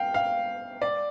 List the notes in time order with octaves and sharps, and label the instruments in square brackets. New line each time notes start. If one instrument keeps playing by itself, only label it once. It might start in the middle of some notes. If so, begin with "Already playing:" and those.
Already playing: [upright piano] F5 G5
F5
D5